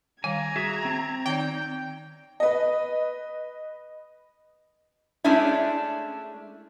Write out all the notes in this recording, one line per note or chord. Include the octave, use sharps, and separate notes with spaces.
D#3 G3 F5 G#5 A#5 G#6
F#4 G#4 E5
C4
D#3 D#4 D5 G5
B4 D#5
G#3 A3 C#4 D4 E4